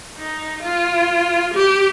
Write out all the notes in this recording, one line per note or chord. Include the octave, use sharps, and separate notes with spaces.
D#4
F4
G4